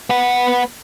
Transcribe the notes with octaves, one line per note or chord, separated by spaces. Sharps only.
B3 F#5